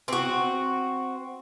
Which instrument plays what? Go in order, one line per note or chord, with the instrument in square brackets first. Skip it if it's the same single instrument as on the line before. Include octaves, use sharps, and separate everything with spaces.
[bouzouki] C4 F#4